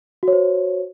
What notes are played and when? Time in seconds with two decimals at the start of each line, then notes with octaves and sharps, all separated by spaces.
0.23 F#4
0.28 C#5
0.33 C5